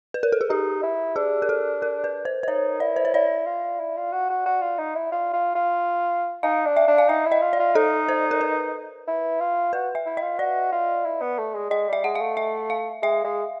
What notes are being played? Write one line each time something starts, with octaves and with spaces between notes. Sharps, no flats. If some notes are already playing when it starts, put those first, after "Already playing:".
B4
A#4
A4
G#4
D#4 G4
E4
D4 G#4
A#4
A4
A#4
B4
C5
C5
D#4 C#5
E4 D5
C5
C#5
E4 D5
F4
E4
F4
F#4
F#4
F#4
F4
D#4
E4
F4
F4
F4
D#4 F5
D4
E5
D4
F5
D#4 E5
E4
D#5
F4
D5
F4
D#4 A4
C5
A#4
B4
E4
F4
F#4 B4
E5
E4
F4 D#5
F#4 D5
F4
E4
B3
A3
G#3
G#3 D#5
G3 E5
G#3 F#5
F5
A3
E5
F5
G#3 E5
G#3